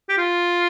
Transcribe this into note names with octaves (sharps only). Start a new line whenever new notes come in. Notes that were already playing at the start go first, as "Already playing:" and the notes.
G4
F4